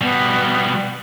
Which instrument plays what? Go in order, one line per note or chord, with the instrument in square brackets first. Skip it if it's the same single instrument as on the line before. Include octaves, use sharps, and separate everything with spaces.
[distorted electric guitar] B2 G3 [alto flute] B3